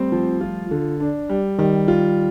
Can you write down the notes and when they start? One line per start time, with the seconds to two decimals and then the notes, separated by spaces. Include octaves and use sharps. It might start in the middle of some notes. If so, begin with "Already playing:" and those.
Already playing: G3 A3 C4
0.12 F3
0.41 F4
0.71 D3
1.00 D4
1.29 G3
1.59 D#3 G3
1.88 F4